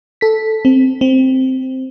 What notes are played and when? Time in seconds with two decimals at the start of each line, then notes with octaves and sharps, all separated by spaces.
0.21 A4 B6
0.65 C4
1.01 C4